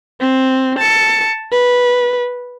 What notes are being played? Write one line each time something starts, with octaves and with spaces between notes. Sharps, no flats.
C4
A5 C#7
B4